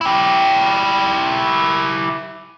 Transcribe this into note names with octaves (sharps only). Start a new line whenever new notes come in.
E4 G4